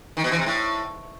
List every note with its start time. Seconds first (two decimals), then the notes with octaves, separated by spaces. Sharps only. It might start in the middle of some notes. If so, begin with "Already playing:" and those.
0.17 D#3
0.24 B2
0.32 E3
0.39 C3
0.46 A2